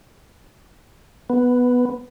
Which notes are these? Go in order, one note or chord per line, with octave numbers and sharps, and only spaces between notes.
B3